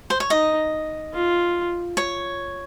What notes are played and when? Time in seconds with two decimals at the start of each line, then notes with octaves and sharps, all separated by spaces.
0.10 C5
0.20 C#5
0.30 D#4 D#5
1.13 F4
1.97 C#5